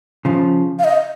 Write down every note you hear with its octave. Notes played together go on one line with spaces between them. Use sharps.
C#3 F3
F5
D#5